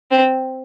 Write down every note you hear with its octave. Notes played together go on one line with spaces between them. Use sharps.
C4